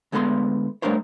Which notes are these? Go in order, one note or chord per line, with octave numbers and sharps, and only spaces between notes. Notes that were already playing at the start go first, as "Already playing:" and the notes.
D2 G#3 B3 A4 A#5 C6
G3 A3 D4 A#4 C5 C#5